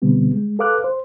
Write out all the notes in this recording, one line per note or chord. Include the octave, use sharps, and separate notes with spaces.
B2 D3 G3 B3 C4
G#3
A4 B4 F5 D6 F6 F#6
C5